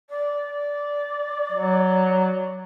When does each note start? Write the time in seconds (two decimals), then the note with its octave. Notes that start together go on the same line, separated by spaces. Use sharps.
0.10 D5
1.52 F#3